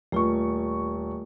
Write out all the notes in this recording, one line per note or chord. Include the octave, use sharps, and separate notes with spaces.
D#1 A3 F4 C#6